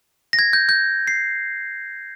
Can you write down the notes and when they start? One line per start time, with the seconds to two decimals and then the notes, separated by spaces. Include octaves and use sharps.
0.33 A#6
0.39 G#6
0.53 G6
0.69 G6
1.07 C7